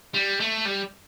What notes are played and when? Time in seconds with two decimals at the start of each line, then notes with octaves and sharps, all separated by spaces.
0.14 G3
0.40 A3
0.65 G3